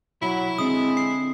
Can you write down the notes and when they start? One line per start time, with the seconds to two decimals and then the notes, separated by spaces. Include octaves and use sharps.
0.22 B1 F#3 E4 B5
0.58 D3 G#3 C4 D#6
0.97 C7